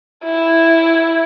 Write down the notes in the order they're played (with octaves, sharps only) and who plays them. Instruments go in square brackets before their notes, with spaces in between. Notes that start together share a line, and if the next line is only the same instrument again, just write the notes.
[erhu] E4